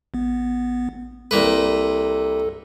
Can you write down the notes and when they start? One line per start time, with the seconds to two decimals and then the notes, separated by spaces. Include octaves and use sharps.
0.14 A1 B3
1.31 C2 A#3 A4 B4